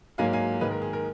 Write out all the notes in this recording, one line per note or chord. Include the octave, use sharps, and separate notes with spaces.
G#2 F#3 A#3 F5 G#5
F5 G#5
G#2 D#3 G#3 G#4 B4
A#4
G#4
A#4